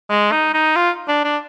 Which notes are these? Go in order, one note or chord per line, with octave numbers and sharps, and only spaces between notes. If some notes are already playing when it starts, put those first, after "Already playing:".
G#3
D#4
D#4
F4
D4
D4